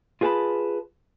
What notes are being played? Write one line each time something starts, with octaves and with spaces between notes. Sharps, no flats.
F4 G#4 B4 F#5 A5 B5